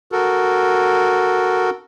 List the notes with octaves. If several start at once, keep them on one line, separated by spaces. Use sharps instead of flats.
F#4 A4 A#4